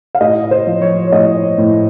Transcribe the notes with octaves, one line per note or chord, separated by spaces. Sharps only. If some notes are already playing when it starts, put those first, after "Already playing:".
F5
A2 D#5
C5
F3
C#5
C#5
A2 D#5
A2